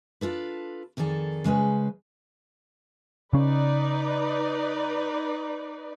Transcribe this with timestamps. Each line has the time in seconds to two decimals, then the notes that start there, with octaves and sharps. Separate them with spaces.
0.21 D4 F4 A4 B4
0.97 F2 D#3 G#4 A4 D5
1.44 C#3 G#3 C#4 B4 C5
3.33 C#3 C#4 D#4 B4 D5